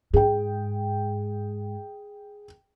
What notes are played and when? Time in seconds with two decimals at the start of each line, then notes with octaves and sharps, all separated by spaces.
0.14 G#2 G#4 G5